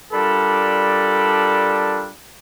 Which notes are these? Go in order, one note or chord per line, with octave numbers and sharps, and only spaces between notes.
G3 D4 F4 A4 A#4 B5